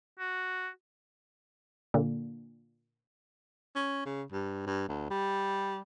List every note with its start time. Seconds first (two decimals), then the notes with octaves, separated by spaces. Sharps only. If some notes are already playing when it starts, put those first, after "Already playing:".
0.19 F#4
1.94 A#2 D3
3.75 C#4
4.06 C#3
4.32 G2
4.66 G2
4.88 D2
5.10 G3